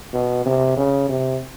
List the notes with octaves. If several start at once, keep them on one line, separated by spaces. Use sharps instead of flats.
B2
C3
C#3
C3